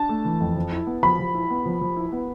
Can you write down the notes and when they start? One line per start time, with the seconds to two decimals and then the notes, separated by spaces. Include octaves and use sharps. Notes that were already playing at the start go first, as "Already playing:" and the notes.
Already playing: D4 A5
0.09 A3
0.25 E3
0.40 F2
0.56 F3
0.72 E4
0.87 B3
1.03 F3 B5
1.19 F3
1.34 E4
1.50 B3
1.65 F3
1.81 F3
1.96 E4
2.12 B3